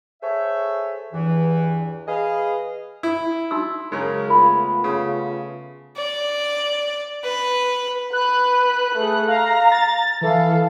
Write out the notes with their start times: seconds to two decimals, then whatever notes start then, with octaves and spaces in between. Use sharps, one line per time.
0.22 G#4 A4 C5 C#5 E5
1.13 E2 G2 E3
2.08 G#4 B4 D#5 F5
3.03 E4
3.51 D#4 F#4 E6
3.92 C#3 F#3 G#3 A#4
4.30 A3 B3 F4 B5
4.84 C#3
5.97 D5
7.24 B4
8.13 B4 F#6
8.95 A3 G#4
9.28 F5 A#5
9.72 A6
10.21 E3 A4 F5